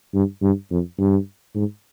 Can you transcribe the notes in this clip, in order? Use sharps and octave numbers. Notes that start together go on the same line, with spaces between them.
G2
G2
F2
G2
G#2